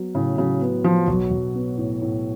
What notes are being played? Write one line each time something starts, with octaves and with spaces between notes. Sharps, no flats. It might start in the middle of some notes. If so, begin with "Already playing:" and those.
Already playing: F#3 B3
A2 C#3
C#3 F#3
B3
F3 B3
B1 F#3
B1
B3
A2
A2